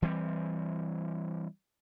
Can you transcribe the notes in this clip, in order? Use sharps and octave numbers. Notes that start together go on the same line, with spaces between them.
E3 G3 C4